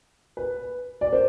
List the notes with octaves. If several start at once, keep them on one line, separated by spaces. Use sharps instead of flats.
B4
D5
C5